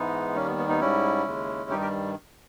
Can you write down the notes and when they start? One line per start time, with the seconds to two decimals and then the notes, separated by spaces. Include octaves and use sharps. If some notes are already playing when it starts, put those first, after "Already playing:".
Already playing: G#2 E3 G#3 B3 D#4
0.35 D#2 D#3 G3 A#3 C#4
0.47 B3
0.58 B3
0.69 B3 D#4
0.81 G#2 G3 C#4 E4
1.25 D#2 C#3 G#3
1.70 G2 D#3 G3 D#4 G4
1.81 G4 A#4